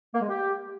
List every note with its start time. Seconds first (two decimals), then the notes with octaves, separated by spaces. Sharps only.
0.15 A#3
0.22 G#3
0.29 G4